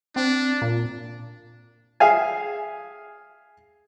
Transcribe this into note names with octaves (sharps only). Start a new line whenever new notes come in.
C4 D4
A#2
G#4 E5 F5 G#5